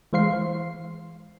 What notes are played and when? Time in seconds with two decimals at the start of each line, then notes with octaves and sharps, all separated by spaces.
0.13 E3 G#3 C5 F5 C6 C7